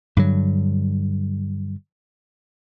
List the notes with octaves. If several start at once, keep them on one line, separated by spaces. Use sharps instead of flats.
G2 D3 F#3